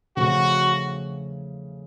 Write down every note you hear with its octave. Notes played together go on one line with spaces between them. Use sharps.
C#3 F3 A3 C#4 F#4